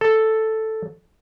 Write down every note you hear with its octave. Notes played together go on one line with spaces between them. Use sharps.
A4